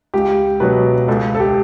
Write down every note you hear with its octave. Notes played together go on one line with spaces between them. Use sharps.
C#2 G4
B2 F#3 B4
C#2 A4
A4
G4